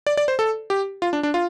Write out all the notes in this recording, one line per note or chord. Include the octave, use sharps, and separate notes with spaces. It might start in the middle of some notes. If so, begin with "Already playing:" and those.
D5
D5
C5
A4
G4
F4
D4
D4
F4